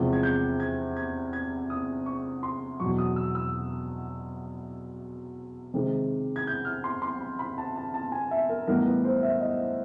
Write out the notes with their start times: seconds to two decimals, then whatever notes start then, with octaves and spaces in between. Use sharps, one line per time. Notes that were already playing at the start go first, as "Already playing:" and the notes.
Already playing: E2 C3 F3 G#3
0.13 G#6
0.23 G6
0.60 G#6
0.96 G#6
1.33 G#6
1.70 D#6
2.06 C#6
2.43 C6
2.80 E2 B2 F#3 C#6
2.98 D#6
3.16 E6
3.35 E6
5.74 C3 D#3 G#3
6.36 G#6
6.47 G6
6.65 F6
6.84 C6
7.02 C6
7.20 B5
7.39 B5
7.58 A5
7.76 A5
7.94 A5
8.12 G#5
8.31 E5
8.49 A#4
8.67 A2 E3 G3 B3 D#4 A#4
8.86 B4
9.04 C5
9.23 E5
9.41 D#5